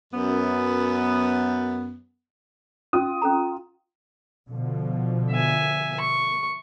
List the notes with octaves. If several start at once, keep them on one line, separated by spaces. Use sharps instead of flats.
F#2 B3
C#4 F4 D#6
C#4 A4 A#5
B2 D3 F3
E5 G#5
C#6